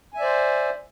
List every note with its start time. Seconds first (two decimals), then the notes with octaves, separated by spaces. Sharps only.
0.14 G#5
0.17 E5
0.20 D5
0.23 C5